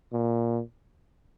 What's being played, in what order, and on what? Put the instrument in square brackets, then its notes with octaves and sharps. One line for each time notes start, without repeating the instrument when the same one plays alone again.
[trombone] A#2